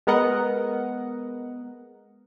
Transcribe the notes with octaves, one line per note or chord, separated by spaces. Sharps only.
G#3 B3 A#4 D#5 F#5